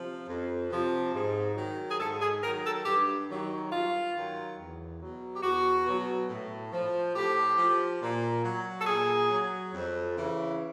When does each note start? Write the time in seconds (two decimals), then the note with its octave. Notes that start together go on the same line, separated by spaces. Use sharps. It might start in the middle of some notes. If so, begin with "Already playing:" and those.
Already playing: C3 F3
0.28 F2
0.70 C3 F3
1.13 G#2
1.56 D#3 F#3
1.91 G#4
1.99 G#2 A4
2.21 G#4
2.43 D#3 F#3 A#4
2.64 A4
2.85 G2 G4
3.29 D#3 F#3
3.71 G2 F4
4.14 D#3 F#3
4.57 E2
5.01 B2 F#3
5.35 G4
5.43 E2 F#4
5.85 B2 F#3
6.29 A2
6.72 F3
7.15 A2 G4
7.57 F3
8.01 A#2
8.44 F#3
8.80 A4
8.87 A#2 G#4
9.30 F#3
9.73 F2
10.16 C#3 E3